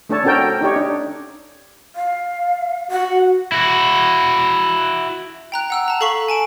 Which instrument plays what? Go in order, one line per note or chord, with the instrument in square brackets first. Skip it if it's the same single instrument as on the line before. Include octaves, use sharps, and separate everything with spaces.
[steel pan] A3 D4 A4 C#5 A5
C4 C#4 F#4 A4 A#4 G5
D4 D#4 G4 C#5
D4
[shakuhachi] F5
[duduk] F#4 [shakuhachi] F#5
[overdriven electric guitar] E4 F#4
[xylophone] G5 A#5 F#6
F#5 E6 F#6
A5 A#5
A4 F5 C#6 B6 F#7
G#5 A5 D7